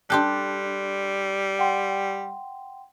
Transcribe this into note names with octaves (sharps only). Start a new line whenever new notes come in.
G3 D4 G4 A4 C6 F#6
F#5 G5 C6